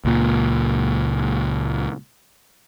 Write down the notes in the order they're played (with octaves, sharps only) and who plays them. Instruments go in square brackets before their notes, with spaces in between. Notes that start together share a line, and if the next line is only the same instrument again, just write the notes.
[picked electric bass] C#2 A#2